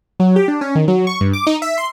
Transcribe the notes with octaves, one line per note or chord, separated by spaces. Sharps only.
F#3
G4
D4
C#4
D#3
F#3
C#6
G2
D6
D#4
E5
C6